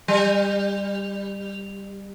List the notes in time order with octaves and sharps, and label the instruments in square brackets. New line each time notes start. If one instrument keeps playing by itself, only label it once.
[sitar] G3